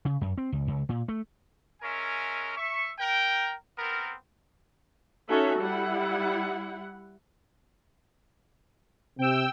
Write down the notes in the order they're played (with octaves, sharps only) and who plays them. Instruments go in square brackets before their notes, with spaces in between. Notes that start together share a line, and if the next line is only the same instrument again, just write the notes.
[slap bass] C#3
F#2
C4
C#2
C#2
A#2
A3
[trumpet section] G#3 C#4 A#4 E5 G#5
E5 C#6
A#4 G5
B3 C4 A#4
[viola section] C#4 D#4 F#4 A4 E5
G3 E4 F#5
[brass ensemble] C3 [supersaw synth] G5 E6